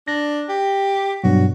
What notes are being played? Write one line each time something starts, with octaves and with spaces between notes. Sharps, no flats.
D4 A#6
G4
G2 B2 F#3 F#4